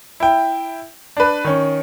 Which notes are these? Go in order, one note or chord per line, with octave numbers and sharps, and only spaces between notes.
E4 G5
D4 B4
D#3 C#4